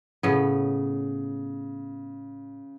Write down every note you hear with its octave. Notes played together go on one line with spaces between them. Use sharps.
A2 C#3 B3